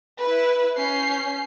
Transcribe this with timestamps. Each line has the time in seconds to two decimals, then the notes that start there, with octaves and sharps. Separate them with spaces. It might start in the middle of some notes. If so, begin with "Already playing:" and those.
0.20 E4 B4
0.76 C#4 G6 C7